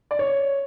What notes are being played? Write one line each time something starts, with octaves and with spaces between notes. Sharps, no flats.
D5
C#5